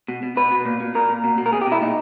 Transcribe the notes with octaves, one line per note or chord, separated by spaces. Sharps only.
B2
B2
B2 B4
B2
A#2
A#2
A#2 A#4
A#2
B2
B2
A#4
B2 G#4
G4
B2 E4
A#2 D#4